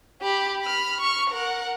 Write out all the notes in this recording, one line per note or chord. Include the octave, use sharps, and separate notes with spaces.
G4 B5
B5 F6
C#6 F6
A#4 F#5